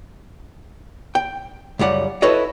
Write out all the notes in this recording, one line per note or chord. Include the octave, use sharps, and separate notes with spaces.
G5
C#2 F#2 G3 F#5
E4 F#4 A4 B4 C#5 D#5